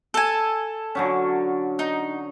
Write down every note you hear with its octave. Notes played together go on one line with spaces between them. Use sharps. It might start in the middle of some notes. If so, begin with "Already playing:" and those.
A4 G#5
D3 F#3 C#4
D#4